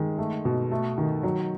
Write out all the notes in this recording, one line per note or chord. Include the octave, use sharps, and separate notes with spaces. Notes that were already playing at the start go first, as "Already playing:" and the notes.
Already playing: D#3 G#3
A3
B2
A3
D#3
F#3